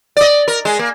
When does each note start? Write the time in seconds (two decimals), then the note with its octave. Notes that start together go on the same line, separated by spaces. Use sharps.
0.17 D5 D#5
0.48 A#4
0.65 G#3
0.79 A#3